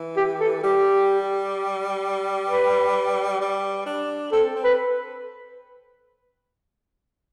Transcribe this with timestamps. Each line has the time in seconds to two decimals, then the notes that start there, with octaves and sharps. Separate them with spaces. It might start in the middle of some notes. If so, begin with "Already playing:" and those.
Already playing: E3
0.17 G4
0.40 A4
0.63 G3 G4
2.48 B4
3.40 G3
3.86 D4
4.32 C4 A4
4.55 C4
4.64 B4